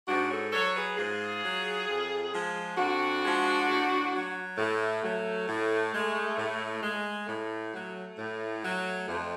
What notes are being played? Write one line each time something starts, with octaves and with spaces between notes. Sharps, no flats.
G#2 D4 F#4
A4 C#5
F#3 A4 C#5
G#4 B4
G#2 F4 G#4
F#3
F2
F3 G#3
F2 D4 F#4
F3 G#3
A2
F#3
A2 A3
F#3 A3
A2
G#3
A2
G#3
A2 A3
F#3
A2
F#3
F2